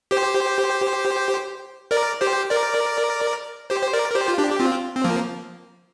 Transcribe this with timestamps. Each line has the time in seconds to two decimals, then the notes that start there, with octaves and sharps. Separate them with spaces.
0.11 G4 C5
1.91 A#4 D5
2.21 G4 C5
2.50 A#4 D5
3.70 G4 C5
3.82 C5
3.93 A#4 D5
4.10 A#4
4.15 G4 C5
4.28 F4
4.38 D4 G4
4.51 G4
4.60 C4 F4
4.96 C4
5.04 F3 A#3